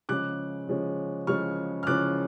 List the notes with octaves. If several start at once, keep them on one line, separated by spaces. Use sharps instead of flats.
C#3 F3 G#3 C#4 D6 F#6
C#3 F3 G#3 C#4
C#3 F3 G#3 C#4 C#6 F6
F6
C#3 F3 G#3 C#4 D6 F#6